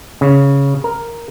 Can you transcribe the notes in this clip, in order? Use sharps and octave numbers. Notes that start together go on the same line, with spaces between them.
C#3
A#4